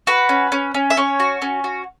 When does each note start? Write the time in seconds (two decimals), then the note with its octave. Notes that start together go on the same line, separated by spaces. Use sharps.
0.07 F#4 B4
0.29 C#4
0.52 C#4
0.74 C#4
0.90 E5
0.97 C#4 C#5
1.20 F#4
1.42 C#4
1.64 F#4